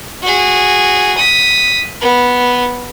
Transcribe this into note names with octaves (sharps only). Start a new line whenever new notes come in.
F#4 G#4
D#6 B6
B3